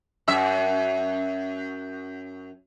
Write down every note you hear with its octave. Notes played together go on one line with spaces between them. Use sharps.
F#2 E5